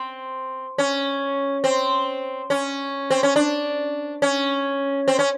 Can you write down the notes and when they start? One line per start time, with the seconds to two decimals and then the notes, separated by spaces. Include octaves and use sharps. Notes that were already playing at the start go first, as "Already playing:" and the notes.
Already playing: C4
0.78 C#4
1.64 C4
2.50 C#4
3.10 C4
3.23 C#4
3.36 D4
4.22 C#4
5.08 C4
5.19 C#4